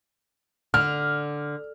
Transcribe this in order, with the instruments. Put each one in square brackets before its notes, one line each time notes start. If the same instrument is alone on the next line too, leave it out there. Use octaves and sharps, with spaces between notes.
[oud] D3 [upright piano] F6